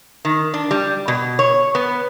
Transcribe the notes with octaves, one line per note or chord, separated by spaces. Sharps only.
D#3
D4
G3
B2
C#5
B3